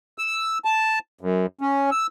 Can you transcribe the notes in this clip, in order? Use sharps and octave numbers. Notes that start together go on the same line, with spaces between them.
E6
A5
F#2
C#4
E6